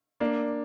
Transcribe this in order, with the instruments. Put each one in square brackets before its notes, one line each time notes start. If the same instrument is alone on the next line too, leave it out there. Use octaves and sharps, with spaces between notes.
[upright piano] A#3 D4